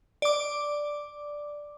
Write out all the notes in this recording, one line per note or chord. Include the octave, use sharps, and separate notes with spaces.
D5 D6